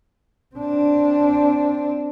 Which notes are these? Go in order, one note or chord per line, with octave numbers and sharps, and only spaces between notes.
C4 D4